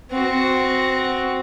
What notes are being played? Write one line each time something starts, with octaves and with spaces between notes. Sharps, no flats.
C4 F#4